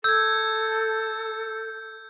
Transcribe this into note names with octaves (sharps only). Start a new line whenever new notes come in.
A4 E6 G6 G#6